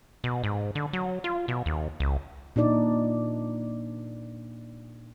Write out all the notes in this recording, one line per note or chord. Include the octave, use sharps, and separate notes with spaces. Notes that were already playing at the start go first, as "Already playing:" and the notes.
B2
G#2
D3
F#3
F4
B2
D#2
C#2
A#2 D4 D#4 D5